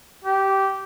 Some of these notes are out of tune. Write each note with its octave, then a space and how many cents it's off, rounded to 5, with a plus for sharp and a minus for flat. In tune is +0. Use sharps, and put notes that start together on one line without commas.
G4 -15